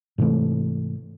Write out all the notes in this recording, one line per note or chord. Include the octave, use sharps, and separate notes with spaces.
G#2 C3 E3 A3